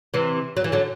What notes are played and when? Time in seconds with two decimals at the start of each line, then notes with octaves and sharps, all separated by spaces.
0.14 C3 E3
0.57 F#3
0.64 E3
0.72 D3 F#3